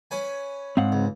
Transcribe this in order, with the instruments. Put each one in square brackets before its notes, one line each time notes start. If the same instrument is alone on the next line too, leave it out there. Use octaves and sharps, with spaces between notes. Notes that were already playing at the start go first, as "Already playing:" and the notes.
[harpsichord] C#4 B4 G#5
[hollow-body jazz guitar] G#2 [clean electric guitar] C4 F5 F#5
[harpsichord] C#2